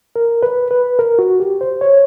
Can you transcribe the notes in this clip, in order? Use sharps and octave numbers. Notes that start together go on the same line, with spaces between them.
A#4
B4
B4
A#4
F#4
G4
C5
C#5